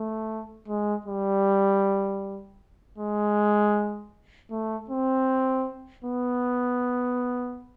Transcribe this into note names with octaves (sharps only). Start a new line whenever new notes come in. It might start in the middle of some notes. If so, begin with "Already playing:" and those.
Already playing: A3
G#3
G3
G#3
A3
C4
B3